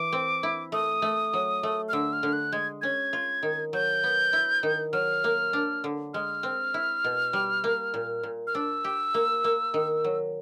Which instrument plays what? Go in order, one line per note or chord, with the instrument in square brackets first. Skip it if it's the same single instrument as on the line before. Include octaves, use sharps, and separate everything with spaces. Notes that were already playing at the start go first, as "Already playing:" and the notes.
Already playing: [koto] E3 [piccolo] D6
[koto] C4
E4
[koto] A3 [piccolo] D#6
[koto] A3
F#3
A3
[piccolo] F6
[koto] D3 [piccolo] E6
[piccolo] F6
[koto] D3
[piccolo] F#6
[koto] G#3 [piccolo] G#6
[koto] C#4 [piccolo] G#6
[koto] F4
D#3
[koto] F#3 [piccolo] G6
[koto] B3
E4
D#3
[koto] F#3 [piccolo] F6
[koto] A#3
D4
D3
[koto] G#3 [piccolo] F6
[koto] C4
E4
B2
G3
A#3
A#2
A#2
[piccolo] F6
[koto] D4 [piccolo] E6
[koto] G4
A#3
A#3
D#3
F#3